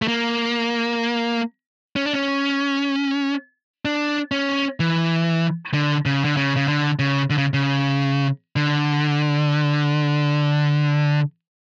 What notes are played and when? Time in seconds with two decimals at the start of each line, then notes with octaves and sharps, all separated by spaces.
0.02 A3
0.08 A#3
1.96 C#4
2.05 D4
2.13 C#4
3.85 D4
4.32 C#4
4.80 E3
5.74 D3
6.06 C#3
6.25 D3
6.37 C#3
6.56 C#3
6.68 D3
6.99 C#3
7.30 D3
7.38 C#3
7.54 C#3
8.56 D3